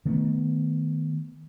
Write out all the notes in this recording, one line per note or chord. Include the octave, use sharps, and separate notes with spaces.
D#3 A3 B3